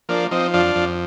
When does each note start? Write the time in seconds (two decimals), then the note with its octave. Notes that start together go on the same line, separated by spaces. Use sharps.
0.09 F3 A#3 D4
0.31 F3 C4 D#4
0.54 F2 D4 F4
0.75 F2